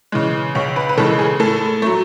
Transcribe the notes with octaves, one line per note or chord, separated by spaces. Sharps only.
C#3 E3 G#3
C#2 C#5
B4
B4
C#3 E3 G#3 A4
G#4
A2 A4
F#3 A3